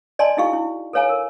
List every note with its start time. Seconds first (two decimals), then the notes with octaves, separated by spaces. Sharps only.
0.19 D5 D#5 G#5 A5 C6
0.37 D#4 E4 F#4 G#4 F5 C#6
0.53 E4
0.93 A4 B4 C#5 F5 G#5 A#5
1.09 A#4